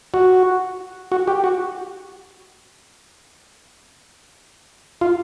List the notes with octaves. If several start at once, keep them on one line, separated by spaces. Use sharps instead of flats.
F#4
F#4
G4
F#4
F4